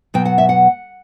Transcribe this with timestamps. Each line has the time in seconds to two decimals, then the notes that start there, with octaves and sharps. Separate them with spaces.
0.14 B2 F#3 B3 G5
0.25 F#5
0.38 E5
0.49 F#5